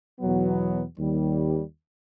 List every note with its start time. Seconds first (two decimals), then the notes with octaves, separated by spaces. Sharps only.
0.20 E2 B2 F#3 B3
0.98 D#2 G3